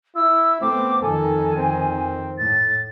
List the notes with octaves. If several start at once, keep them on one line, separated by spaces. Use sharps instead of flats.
E4 E6
A3 B3 C4 D6
F2 D#3 A4 G#5
C4
A2 A6